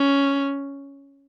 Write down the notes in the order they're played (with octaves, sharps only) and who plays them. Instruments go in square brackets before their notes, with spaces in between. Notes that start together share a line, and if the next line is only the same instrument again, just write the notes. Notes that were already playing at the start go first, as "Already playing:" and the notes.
Already playing: [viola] C#4